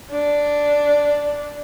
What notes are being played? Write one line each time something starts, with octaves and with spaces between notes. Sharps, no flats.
D4